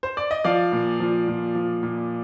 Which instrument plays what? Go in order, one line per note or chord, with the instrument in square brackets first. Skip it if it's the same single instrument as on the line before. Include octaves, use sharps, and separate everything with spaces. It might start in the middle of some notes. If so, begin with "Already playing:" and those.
[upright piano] C5
D5
D#5
F3 D5 F5
A#2
F3
A#2
F3
A#2